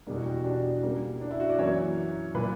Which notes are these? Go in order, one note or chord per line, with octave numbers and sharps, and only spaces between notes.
E2 B2 G3 A#3 D4
F#4
G4
F#4
D4
C#3 G3 A#3
D4
E4
F#4
D5
F#2 E3 A#3 C#5
A#2 F#3 A#3 B4